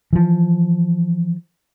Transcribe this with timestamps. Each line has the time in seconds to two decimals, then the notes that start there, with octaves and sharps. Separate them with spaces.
0.13 E3 F3